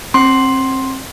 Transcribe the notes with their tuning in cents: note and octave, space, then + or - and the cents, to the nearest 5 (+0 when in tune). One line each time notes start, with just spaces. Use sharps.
C4 +30 C6 +5